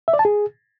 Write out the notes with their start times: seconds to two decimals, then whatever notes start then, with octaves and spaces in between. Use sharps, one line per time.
0.08 E5
0.14 D5
0.19 A5
0.25 G#4